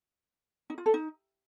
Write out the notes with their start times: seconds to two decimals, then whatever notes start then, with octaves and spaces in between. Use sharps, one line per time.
0.70 D#4
0.78 F4
0.86 A4
0.94 D#4